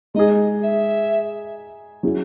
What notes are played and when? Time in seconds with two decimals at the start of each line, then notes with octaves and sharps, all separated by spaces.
0.15 G#3 D#4 G#4 D#5
0.63 E5
2.03 F#3 C#4 E4 G#4